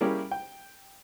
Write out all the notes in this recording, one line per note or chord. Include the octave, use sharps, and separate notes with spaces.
G3 A#3 C#4 E4 G4 G#4
G5